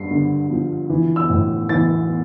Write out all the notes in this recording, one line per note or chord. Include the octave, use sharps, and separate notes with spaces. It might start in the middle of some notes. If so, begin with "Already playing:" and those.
Already playing: G2 C7
D3
F3
E3
E6
A2
E3 A6